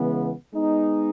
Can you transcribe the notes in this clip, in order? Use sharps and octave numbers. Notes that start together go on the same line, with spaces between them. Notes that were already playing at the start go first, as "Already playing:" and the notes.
Already playing: C#3 E3 G#3 B3
G#3 B3 D#4